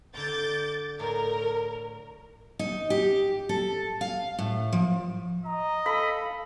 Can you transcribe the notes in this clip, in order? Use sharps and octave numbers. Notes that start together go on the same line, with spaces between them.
D3 D4 A#5 D6 G6 A6
A2 A#4
D#4
G4
A4
F5
A2
F3
D#5 A#5
A4 F5 B5